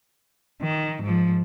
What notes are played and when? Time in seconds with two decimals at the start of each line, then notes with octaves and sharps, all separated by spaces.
0.62 D#3
1.03 G#2 F3